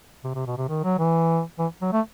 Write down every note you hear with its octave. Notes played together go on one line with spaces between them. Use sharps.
C3
C3
B2
C3
D#3
F#3
E3
E3
F#3
A3